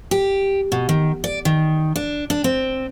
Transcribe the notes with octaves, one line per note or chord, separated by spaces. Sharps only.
G4
B2
D#3
D5
D#3
D4
D4
C4